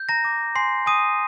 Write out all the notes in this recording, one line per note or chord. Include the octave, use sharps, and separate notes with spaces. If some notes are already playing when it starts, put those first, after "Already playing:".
Already playing: G6
A#5 A#6
D6
G#5 C6 C7
G#5 D#6 D#7